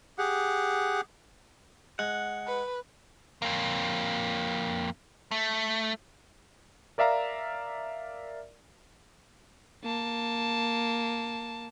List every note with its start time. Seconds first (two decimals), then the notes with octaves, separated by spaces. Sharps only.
0.18 G4 G#4 F#5
1.99 G#3 F#5
2.47 B4
3.42 F2 A#3
5.31 A3
6.98 A#4 D5 E5 F5 A#5
9.83 A#3 A5